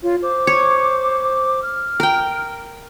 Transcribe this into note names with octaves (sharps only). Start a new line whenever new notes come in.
F4 C#5
C5 D6
C#5
F6
A#4 G5